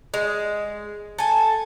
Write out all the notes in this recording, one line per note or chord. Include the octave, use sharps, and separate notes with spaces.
G#3
A4 G#5